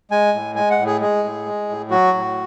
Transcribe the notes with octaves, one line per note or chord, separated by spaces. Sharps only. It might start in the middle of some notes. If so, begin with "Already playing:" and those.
G#3 G#5
A2
G#3 G#5
F#5
A2
G#4
G#3 G#4
A2
G#3
A2
F#3 F#4
A2